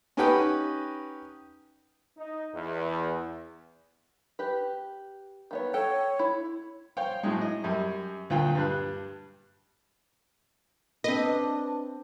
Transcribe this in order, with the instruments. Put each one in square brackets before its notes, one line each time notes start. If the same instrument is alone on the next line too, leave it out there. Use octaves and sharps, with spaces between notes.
[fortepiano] C#4 D#4 G4 B4 F#5 G5
[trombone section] D#4
E2
[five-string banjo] G4 B4
D#3 B3 C#5
[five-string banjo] A4 F#5 G5 [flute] C#5
[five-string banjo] E4
[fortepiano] C5 C#5 F5 G5
A2 F#3 G#3
D#5
F#2 G3
D2 A#2 F4 G5
G2 G3 F#6
[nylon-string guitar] C4 B4 [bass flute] D4 [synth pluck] D#5